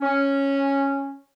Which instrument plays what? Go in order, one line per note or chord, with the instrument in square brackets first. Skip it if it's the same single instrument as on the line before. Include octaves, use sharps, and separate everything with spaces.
[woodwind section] C#4